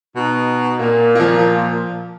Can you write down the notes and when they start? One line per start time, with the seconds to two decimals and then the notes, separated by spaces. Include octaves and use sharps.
0.14 B2 D#4
0.79 A#2 A#3
1.15 F3 A#3
1.39 F3